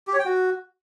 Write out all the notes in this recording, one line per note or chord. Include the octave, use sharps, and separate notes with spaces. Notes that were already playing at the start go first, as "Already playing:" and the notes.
G4
C#5
G5
F#4